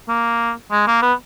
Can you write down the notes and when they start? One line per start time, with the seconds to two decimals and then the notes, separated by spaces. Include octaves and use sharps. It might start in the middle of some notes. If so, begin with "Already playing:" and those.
0.09 A#3
0.72 G#3
0.88 A#3
1.02 B3